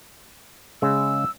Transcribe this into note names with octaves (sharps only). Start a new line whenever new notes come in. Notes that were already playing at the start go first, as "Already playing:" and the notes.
C#3 G#3 E6